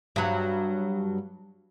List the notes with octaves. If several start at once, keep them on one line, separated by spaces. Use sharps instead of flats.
G2 F#3